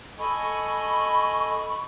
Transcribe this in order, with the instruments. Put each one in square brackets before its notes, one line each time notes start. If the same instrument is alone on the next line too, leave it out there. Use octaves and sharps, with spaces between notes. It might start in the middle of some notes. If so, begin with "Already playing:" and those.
[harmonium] A4 D#5 G#5 [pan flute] B5 [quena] C#6